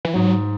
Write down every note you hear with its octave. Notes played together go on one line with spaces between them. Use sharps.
E3
G#2 F#3